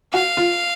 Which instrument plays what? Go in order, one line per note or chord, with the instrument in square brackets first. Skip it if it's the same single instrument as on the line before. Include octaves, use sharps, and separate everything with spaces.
[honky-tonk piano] F#4 [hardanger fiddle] F5
[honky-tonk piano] F4